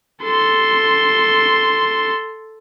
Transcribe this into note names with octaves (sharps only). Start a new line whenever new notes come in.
A4 C6